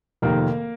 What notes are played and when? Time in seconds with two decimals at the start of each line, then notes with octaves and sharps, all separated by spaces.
0.22 F1 F2 C3 D#3 A#3 A#4